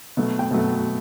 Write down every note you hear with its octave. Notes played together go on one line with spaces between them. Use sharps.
B2 F#3 A3
G5
B2 F#3 A3